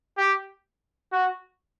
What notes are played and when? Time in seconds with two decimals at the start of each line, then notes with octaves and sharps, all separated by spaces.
0.18 G4
1.12 F#4